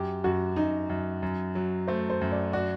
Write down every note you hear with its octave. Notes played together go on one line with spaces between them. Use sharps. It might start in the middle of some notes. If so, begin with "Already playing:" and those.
Already playing: F#2 G4
F#2 F#4
F#2 D#4
F#2
F#2
F#3
A3 C5
C5
F#2
D5
F#4 D5